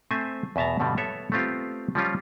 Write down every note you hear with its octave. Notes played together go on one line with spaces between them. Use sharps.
A3 C4 C5 E5 G#5
E2 B2 E5 A5 A#5
G2 B2 D3 G3
B3 A4 C#5 E5
A3 B3 C4 F4 G4
F3 G3 C#4 F4